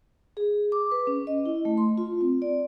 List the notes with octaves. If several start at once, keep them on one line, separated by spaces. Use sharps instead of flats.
G#4
D6
B4
C#4
D#5
E4
A3
C6
F4
C4
D5